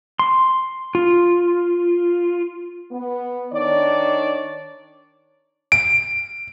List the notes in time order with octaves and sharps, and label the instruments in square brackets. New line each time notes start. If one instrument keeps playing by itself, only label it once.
[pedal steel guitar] C6
F4
[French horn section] B3
D#3 D4 C#5 D5
[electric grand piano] D7